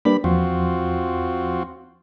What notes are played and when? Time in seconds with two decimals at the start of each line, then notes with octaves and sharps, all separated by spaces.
0.05 G3 A#3 D4 B4 B5
0.24 E2 F3 C4 F4 F#4